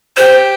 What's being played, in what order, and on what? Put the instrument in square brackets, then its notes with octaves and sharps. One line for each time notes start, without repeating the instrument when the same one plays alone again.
[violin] G4 [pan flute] C5